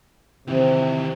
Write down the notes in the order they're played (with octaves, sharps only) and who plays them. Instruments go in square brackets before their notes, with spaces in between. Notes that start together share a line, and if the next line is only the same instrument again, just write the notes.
[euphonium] C3 [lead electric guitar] D#3 E3 [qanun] C4